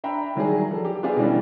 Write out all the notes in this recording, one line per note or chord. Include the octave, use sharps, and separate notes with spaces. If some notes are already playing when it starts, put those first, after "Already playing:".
D4 E5 G5 A#5 B5
D#3 F#3 G3 G#4
F3 A4
G4
B3 F4 G4 G#4 D5 E5
B2 D3 E3 G3 C#4